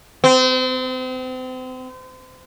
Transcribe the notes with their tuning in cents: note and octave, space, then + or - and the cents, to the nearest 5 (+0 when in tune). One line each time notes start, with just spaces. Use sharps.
C4 -35